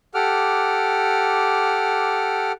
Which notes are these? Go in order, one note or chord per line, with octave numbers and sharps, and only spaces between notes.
G4 A4 F#5 D6 F6